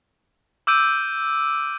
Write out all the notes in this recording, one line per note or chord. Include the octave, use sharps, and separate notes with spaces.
D6 E6 F6 G6 D7 D#7